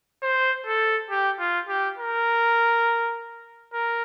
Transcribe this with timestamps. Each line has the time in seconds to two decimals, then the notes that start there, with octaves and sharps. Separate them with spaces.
0.23 C5
0.66 A4
1.10 G4
1.39 F4
1.69 G4
1.98 A#4
3.73 A#4